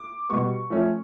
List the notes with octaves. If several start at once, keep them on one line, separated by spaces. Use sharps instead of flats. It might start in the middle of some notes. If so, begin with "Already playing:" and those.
Already playing: D6
B2 G3 B3 C#6
F3 A3 C#4